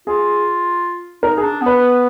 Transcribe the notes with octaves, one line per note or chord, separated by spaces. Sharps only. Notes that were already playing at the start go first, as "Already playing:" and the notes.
F4 G#4
D#4 A#4
G#4
D4
B3 B4